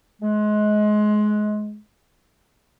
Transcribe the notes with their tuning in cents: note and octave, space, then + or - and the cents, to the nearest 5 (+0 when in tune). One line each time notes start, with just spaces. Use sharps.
G#3 +25